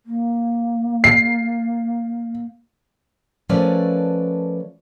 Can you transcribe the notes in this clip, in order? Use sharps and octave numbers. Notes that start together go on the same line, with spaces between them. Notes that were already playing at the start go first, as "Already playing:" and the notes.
A#3
C7
F3 A3 C#4 A#4 B4 D5